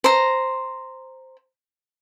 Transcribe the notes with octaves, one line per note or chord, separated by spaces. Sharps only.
C5 A#5